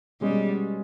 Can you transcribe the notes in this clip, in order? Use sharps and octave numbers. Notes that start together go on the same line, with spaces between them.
B2 G3 G#3 C#4 G#4 D#5